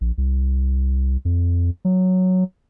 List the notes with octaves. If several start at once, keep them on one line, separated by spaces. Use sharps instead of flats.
A#1
C2
F2
F#3